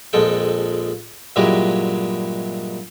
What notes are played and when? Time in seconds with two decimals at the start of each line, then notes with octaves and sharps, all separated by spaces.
0.13 A#1 F2 G#3 A4 G5
1.36 G2 A#2 F#3 G#3 E4 G4